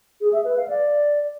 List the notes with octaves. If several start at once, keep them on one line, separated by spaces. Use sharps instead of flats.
G#4
E5
B4
F5
D5